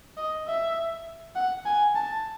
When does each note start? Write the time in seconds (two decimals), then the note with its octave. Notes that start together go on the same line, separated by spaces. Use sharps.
0.17 D#5
0.47 E5
1.36 F#5
1.65 G#5
1.95 A5